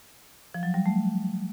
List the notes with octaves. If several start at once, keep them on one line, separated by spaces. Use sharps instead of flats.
F3
F#3
G3
A3